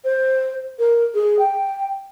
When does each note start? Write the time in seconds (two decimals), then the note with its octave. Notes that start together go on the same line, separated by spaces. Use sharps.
0.04 C5
0.79 A#4
1.14 G#4
1.39 G5